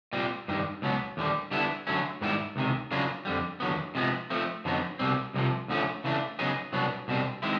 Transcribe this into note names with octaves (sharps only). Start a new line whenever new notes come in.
A#2 G3 C4
G2 D#3 G3
C#2 B2 F#3 B3
D#2 D3 G3
D3 G3 B3 E4 A4
D3 F#3 A3 C#4
G#2 D#3 G3 B3 E4
C#2 C3 D#3
C#3 F#3 A#3 D4 F4
F2 D3 G3
D#2 D3 F#3 B3
C3 F3 G#3 B3
F3 A3 C4
F2 D3 F#3 B3 D#4
C2 B2 G3 C4
C2 C3 F3
D2 D3 F3 A3 C#4
C#3 E3 A3 D4
C#3 F#3 B3 D#4 G#4
C2 B2 F#3 B3 D4
C2 B2 G3 C4
D#3 G#3 C4 E4